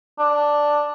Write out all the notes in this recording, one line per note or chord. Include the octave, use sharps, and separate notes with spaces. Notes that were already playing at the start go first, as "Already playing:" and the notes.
D4